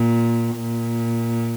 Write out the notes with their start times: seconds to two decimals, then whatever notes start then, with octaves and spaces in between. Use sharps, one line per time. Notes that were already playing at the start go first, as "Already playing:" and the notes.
Already playing: A#2
0.56 A#2